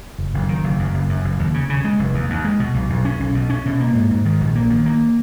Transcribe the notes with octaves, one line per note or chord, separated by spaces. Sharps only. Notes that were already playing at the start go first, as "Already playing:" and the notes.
F#1
F#1
D#3
F#1
F#2
F#1
F#2
F#1
D#2
C#3
C#3
G#3
F1
D#2
D#2
G#3
B2
B1
B1
C#4
B1
B2
C#4
B2
A#3
G#2
G#2
D#3
A#1
A#3
D#3
A#3